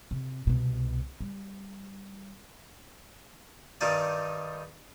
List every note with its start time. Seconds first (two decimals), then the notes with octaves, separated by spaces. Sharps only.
0.11 C3
0.47 C2 B2
1.20 G3
3.81 G2 D#3 G3 D#4 D5